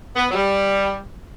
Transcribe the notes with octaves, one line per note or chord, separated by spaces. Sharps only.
B3
F#3
G3